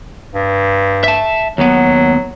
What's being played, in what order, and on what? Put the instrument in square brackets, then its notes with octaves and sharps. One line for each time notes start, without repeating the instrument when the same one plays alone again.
[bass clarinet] G2
[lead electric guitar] E5 A5
[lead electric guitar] D#2 B3 [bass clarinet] F#3